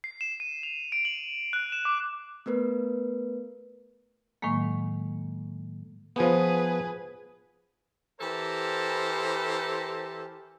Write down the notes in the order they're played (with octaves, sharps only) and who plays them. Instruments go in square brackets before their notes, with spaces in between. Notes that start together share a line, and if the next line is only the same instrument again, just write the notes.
[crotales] C7
E7
D#7
F7
D7
F#7
F#6
E7
D6
[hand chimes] A3 B3 A#4 B4
[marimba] A2 D#3 F#3 G#3 A#3
[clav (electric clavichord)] F3 B3 [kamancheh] G#4 B4
[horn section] E3 G4 A4 A#4 C5